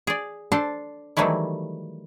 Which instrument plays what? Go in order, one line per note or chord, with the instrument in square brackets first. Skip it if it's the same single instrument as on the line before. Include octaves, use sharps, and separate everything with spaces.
[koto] G#4 D5
D4 A4 C5 A5
D#3 E3 F#3 G3 A3 E4